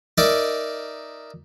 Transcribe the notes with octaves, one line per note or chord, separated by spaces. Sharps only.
D#4 A#4 D5 E5